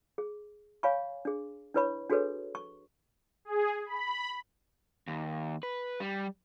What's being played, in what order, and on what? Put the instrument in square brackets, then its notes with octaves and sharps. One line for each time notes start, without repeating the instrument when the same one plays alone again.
[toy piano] G#4
C#5 F5 G#5 B5 C#6
D4 G#4
D4 E4 B4 C#5 B5 C#6
D4 F#4 G#4 A4 B4 C#5
C#6
[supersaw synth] G#4
B5
[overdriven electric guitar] D#2
B4
G3